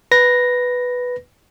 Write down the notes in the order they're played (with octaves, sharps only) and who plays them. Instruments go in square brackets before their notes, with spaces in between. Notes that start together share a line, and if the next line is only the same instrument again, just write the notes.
[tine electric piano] B4 A#6